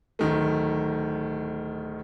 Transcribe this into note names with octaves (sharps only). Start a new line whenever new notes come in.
D1 D#3 A3